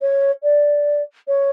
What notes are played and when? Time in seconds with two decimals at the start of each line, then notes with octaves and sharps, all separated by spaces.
0.01 C#5
0.43 D5
1.28 C#5